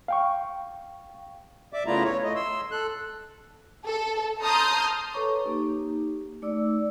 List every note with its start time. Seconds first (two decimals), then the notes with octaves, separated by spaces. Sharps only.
0.08 F5 G5 C#6
1.73 D5 E5 D6
1.86 C#3 A3 B3 E4 F4 A#5
2.04 C#5
2.24 A3 D#5
2.36 C6 E6
2.72 A4 F#6
3.85 A4
4.42 A5 A#5 C6 D#6 F6 G6
5.13 A4 B4 C#5 A#5 C#6 D6
5.44 A#3 D#4 G4
6.42 A3 D#4 D5 D6 E6